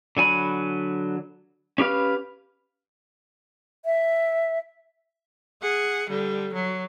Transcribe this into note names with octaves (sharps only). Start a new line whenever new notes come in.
D3 F#3 G#5 B5
C#4 G4 B4 F5
E5
G#4 F#5
D3 G3
F#3